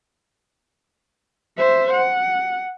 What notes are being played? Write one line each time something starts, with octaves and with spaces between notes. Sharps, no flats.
C5 E5
F#5